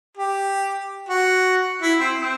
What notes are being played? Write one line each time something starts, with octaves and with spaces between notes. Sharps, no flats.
G4
F#4
E4
C4
C4